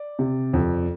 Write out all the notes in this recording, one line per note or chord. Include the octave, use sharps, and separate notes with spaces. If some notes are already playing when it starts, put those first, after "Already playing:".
Already playing: D5
C3
F2